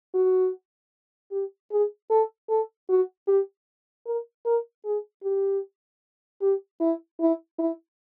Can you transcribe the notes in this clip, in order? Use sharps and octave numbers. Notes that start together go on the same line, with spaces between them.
F#4
G4
G#4
A4
A4
F#4
G4
A#4
A#4
G#4
G4
G4
E4
E4
E4